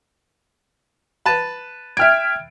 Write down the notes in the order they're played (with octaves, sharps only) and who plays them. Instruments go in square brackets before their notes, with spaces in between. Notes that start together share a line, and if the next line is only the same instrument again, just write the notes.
[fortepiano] B4 A5
[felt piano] E5 G5 D7 [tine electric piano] F6 G#6